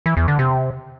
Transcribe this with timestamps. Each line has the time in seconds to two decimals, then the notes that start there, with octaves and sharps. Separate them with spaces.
0.06 E3
0.17 E2
0.28 D3
0.39 C3